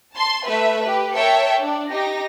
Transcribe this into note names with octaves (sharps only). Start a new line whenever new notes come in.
A5 C6
A3 B4 E5
G4 B4
A#4 C#5 E5 G5 A5 C#7
D4
D#4 G4 A#6